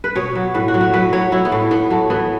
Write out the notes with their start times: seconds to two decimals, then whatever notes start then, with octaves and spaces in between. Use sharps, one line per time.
0.04 B4
0.15 B2 C#5
0.35 F#3
0.54 A2 B4
0.68 F#4
0.74 F#3
0.80 F#4
0.93 F#3 B4
1.13 F#3 C#5
1.32 F#3 E4
1.45 B3
1.52 A2
1.71 A2 B3
1.90 F#3 A3
2.10 E3 B3